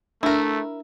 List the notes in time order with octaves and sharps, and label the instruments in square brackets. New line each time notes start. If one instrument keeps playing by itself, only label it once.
[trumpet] A3 [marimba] D4 [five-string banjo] E4 A#4